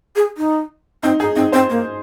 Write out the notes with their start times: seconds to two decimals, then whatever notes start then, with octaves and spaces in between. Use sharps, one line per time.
0.16 G#4
0.37 D#4
1.03 C4 D#4
1.20 D#4 G#4
1.36 C4 D#4
1.52 C4 C5
1.70 A#3